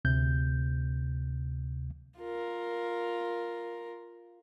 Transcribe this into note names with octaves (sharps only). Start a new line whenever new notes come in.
D2 C3 G6
F4 A#4